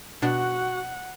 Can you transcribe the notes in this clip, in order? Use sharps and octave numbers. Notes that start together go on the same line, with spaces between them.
B2 D4 F#4 F#5